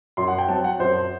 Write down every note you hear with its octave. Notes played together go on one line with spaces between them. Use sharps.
F#2 C6
F#5
G5
F#3 C4 A5
F#5
F#2 C5